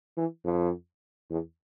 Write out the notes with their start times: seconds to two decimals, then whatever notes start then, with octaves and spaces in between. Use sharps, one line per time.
0.17 E3
0.44 F2
1.30 E2